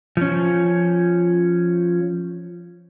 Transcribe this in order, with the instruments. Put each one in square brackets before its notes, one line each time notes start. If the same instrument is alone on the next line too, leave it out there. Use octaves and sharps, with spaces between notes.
[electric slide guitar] F3 C#4